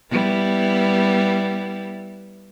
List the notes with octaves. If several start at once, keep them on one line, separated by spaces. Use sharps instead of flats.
G3 B3 E4